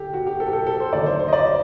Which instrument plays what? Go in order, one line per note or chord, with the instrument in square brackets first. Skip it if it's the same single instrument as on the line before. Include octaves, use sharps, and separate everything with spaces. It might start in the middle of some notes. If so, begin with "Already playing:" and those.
Already playing: [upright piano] D3 G4 A4
F#4
G4
A4
G4
A4
A4
C5
D#2 D3 F#3 A#3 D5
C5
C5
D#5
D5